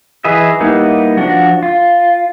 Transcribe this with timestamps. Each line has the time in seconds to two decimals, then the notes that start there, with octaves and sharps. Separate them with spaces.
0.24 E3 G#4 B4 D#5 E5
0.60 G3 A#3 B3 D#4 E4
1.17 F3 D4 F#4
1.63 F4